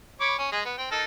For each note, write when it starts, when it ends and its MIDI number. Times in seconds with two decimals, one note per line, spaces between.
0.21 0.35 73
0.21 0.35 83
0.21 0.35 86
0.38 0.50 61
0.52 0.60 56
0.52 0.60 68
0.65 0.75 59
0.78 0.87 60
0.78 0.87 79
0.91 1.04 63
0.91 1.04 69
0.91 1.04 70